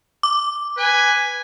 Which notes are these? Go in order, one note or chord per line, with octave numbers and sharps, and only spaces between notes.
D6
B4 G#5